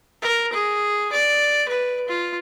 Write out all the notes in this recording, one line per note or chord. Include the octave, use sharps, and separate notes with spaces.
A#4
G#4
D5
B4
F4